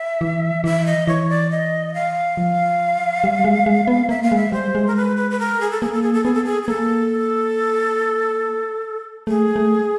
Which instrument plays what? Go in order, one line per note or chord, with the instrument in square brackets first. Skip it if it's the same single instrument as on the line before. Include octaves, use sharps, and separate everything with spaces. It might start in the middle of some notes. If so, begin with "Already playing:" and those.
Already playing: [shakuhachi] E5
[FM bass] E3
[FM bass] E3 [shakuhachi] E5
[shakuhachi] D#5
[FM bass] E3 [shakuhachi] C#5
[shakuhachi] D5
D#5
F5
[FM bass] F3
G3
G#3
G#3
B3
[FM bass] A#3 [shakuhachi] E5
[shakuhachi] F5
[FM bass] G#3 [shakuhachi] E5
[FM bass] G3 [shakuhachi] C5
[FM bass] G#3
[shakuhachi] A#4
B4
B4
B4
A#4
G#4
A4
[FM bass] A#3 [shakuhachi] G#4
[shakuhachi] A4
G#4
A4
[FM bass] B3 [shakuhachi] G#4
[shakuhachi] A4
G#4
G#4
[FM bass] A#3 [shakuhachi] A4
[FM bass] A3 [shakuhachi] G#4
[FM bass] A3